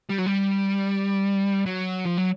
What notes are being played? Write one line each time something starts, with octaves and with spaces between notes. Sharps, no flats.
G3
F#3
G3
F#3
F3
F#3